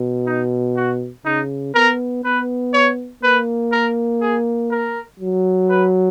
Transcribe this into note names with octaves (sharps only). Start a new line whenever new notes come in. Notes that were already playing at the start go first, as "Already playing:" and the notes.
Already playing: B2
D#4
F#4
C#3 D#4
B3 A#4
B3 B4
C#5
A#3 B4
A#4
G#4
A#4
F#3
B4